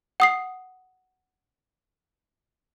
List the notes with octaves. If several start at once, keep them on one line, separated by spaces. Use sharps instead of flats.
F#5 D#6 C7